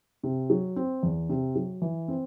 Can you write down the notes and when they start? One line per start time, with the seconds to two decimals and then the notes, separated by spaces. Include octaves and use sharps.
0.23 C3
0.50 F#3
0.76 C4
1.03 E2
1.29 C3
1.55 F#3
1.82 E3
2.08 C4